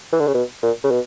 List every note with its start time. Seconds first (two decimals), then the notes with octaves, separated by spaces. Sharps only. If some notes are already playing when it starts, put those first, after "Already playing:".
0.13 E3
0.20 D3
0.27 C#3
0.34 B2
0.63 A#2
0.84 C#3
0.91 B2